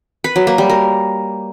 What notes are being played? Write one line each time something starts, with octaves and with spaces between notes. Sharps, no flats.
B4
F#3
A#3
G3
A#4